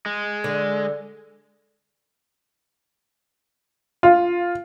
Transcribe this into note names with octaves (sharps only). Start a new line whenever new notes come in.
G#3
D3
F4